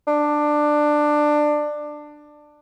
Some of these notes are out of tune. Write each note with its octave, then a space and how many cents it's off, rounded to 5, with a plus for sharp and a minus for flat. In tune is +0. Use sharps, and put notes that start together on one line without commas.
D4 +15